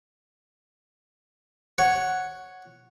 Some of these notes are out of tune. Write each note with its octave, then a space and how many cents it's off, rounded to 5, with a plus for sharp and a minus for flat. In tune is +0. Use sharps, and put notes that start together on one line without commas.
C#5 +0 F#5 +0